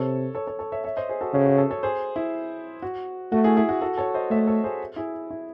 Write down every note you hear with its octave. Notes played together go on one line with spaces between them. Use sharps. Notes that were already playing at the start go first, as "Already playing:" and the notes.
Already playing: C3 A4 C#5
A4 C#5
A4 C#5
A4 C#5
C#5 E5
C#5 E5
C5 D#5
G#4 C5
F#4 A4
C#3 F#4
F#4
F#4 A4
A4 C#5
G#4 C5
E4 G#4
F#4
A3 F#4
E4 G#4
E4 G#4
F#4
F#4 A4
A4 C#5
C5 D#5
A3 C#5 E5
A4 C#5
G#4 C5
E4 G#4
E4